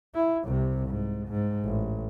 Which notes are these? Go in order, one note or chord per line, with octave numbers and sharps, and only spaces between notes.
E4
C2 C3
G#2
G#2
A1